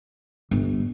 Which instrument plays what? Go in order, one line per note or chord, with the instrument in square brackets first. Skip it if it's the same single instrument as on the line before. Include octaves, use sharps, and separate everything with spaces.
[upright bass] G1